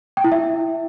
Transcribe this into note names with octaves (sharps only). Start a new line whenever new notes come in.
G5
E4
E5